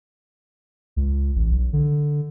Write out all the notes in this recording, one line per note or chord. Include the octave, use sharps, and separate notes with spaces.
C#2
A1
B1
D3